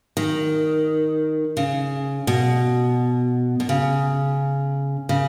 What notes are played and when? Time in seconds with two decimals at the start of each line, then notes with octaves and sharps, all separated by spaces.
0.17 D#3
1.57 C#3
2.27 B2
3.60 B2
3.69 C#3
5.09 C#3